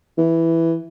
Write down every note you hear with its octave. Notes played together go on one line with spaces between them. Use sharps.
E3